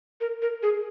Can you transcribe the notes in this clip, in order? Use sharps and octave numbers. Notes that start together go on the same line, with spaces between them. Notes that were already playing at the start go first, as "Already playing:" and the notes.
A#4
A#4
G#4